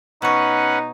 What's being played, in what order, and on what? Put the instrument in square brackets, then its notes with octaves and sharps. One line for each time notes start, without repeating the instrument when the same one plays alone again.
[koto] B2 C#5 [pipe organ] C#4 B4 F#5 [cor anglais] D#4